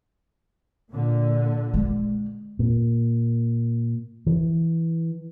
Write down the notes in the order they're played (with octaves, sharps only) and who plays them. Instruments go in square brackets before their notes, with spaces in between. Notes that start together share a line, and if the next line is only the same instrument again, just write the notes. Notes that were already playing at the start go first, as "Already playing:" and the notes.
[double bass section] A#2 D3
[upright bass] G#3
[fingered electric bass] A#2
E3